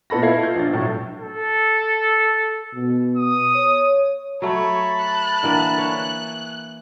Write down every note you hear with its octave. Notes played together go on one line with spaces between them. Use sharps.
A#2 B3 A4 B5 A#6
E4 A4 F5 G#6 C7
F4 G6
A#1 D4 A6
A2 F#3 A3
A4
B2
D#6
C#5
F#3 A3 C#5 A5 B5
F#6
D3 E3 A#3
C#5